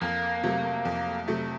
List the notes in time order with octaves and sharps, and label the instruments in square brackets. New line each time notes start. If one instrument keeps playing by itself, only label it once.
[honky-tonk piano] F2 [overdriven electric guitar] A#3
[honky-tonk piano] C3 F#3 A3
F2
C3 F#3 A3